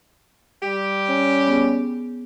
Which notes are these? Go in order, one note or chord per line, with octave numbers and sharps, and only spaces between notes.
G3 G4
C#4
B3 G#4